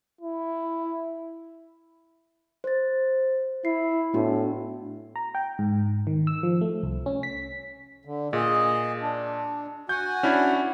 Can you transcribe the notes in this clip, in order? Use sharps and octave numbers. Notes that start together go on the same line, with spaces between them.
E4
C5 A6
E4 C7
A2 B3 D4 F#4
A#5
G5
G#2
D#3
E6
F3
A3
C2
C#4
B6
D3
A#2 G#4 D#5
D4
F#4 F#5 G#5 G6
C#4 D4 E4